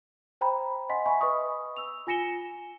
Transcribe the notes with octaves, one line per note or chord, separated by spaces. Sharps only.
C5 G5 A#5 B5
D#5 F#5 G#5 C6 B6
E5 G#5 B5 C#6
B4 D#5 B5 C#6 D#6
E6 F7
F4 G#5 A#6 C#7 E7 G7